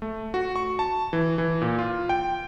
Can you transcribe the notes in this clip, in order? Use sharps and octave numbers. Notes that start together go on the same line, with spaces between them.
A3
F#4
C#6
A5
E3
E3
A#2
F4
G5